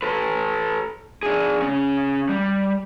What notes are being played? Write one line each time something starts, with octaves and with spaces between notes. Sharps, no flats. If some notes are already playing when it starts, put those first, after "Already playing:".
A4 B4
D4 G#4
C#3 C#4
G3